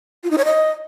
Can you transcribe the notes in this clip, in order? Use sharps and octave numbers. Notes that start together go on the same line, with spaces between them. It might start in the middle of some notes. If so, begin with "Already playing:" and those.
F4
D#4
C#5
D#5